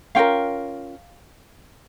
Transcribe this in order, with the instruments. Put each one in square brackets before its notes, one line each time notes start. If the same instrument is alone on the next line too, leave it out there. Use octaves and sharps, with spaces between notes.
[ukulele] C#4 F4 A#4 F5 G5